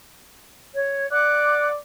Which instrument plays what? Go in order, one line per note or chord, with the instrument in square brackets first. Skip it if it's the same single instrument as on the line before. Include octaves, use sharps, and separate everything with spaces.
[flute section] C#5
[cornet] D5 [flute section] F#5 D6 F#6